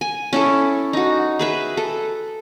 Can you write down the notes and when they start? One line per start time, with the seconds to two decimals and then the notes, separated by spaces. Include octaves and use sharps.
0.01 G#5
0.33 C#4 E4 A4
0.93 D#4 F#4
1.39 G#4 B4 E5
1.77 A4